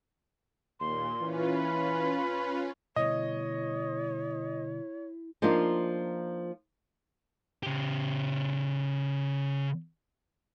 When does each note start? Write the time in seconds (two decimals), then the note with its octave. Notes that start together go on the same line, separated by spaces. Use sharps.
0.80 D#2 A#2 C6
1.21 E3 C#4 F4 B4
1.55 B5
2.96 B2 D3 G3 E4 C#5 D#5
5.42 F3 A#3 D4 D#4 F4
7.63 C#3 G4